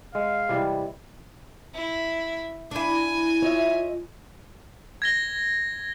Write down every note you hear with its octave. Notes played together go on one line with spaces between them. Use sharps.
G#3 F5
C3 E3 G3
E4
D4 E4 G#5
F4 C#5 D#5 E5
G#6 A#6 G7